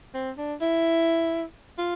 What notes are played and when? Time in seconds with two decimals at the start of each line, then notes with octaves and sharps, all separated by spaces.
0.14 C4
0.37 D4
0.61 E4
1.78 F4